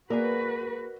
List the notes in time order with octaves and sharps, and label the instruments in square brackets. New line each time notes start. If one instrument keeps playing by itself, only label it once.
[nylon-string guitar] A#3 G#4 [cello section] F#4 B4 [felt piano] A#4 D5